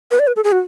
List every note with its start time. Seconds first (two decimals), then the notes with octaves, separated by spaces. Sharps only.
0.11 B4
0.19 D5
0.27 B4
0.36 A4
0.44 G#4
0.52 F#4